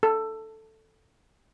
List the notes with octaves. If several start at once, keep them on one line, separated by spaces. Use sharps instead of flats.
A4